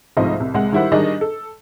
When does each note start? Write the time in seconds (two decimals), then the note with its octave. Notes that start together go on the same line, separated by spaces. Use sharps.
0.17 C2 G#2 F3 A3 D#5
0.40 C2
0.54 C2 G#3 F#5
0.72 D#3 G3 E4 C5 F#5
0.92 D#3 G3 D4 D#4 G#4 D#5
1.21 A4